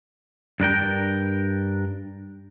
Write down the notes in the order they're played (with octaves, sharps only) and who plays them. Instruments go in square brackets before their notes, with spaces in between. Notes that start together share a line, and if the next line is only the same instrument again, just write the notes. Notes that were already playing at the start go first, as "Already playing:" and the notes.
[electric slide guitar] G2 D4 A#4 G5